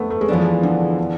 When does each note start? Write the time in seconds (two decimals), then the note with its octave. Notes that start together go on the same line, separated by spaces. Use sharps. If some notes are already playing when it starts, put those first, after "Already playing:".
Already playing: F2 D3 A3 B3
0.10 A3
0.21 G#3
0.28 E3 F3 B3 D4
0.42 G#3
0.63 D3
0.99 D3